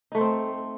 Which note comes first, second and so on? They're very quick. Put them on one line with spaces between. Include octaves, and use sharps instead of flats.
D#4 A3 C5 C4